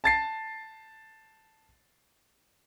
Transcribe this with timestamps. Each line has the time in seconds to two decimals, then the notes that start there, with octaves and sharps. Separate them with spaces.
0.04 A5 A6 C7